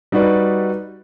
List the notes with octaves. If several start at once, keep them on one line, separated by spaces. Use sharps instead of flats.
G3 D#4 F#4 B4 D5